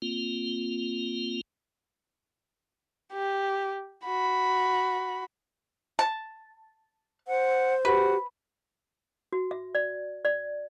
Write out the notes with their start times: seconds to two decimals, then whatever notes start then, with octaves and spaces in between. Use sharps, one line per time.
0.02 A#3 C4 F4
3.13 G4
4.06 F#4 B5
5.99 A5
7.28 C5 F#5
7.85 F#4 G4 B4
9.33 F#4
9.51 E5
9.75 D5
10.25 D5